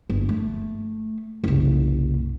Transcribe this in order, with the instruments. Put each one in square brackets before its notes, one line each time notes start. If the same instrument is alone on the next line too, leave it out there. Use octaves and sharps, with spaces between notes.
[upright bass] G1
A3
F#1 C2